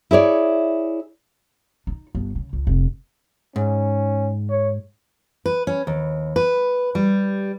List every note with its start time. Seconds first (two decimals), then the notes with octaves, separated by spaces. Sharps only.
0.11 E4 G#4 C#5 D5
1.87 D#4
2.15 G1
2.35 C#3
2.53 C#2
2.67 F1
3.56 G#2 C#4
4.50 C#5
5.46 B4
5.67 C#4
5.87 D#2
6.36 B4
6.95 G3